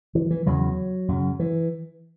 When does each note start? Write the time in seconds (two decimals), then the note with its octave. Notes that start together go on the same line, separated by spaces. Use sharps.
0.15 E3
0.30 E3
0.46 E2 C#3 F#3
1.08 F#2 C#3
1.39 E3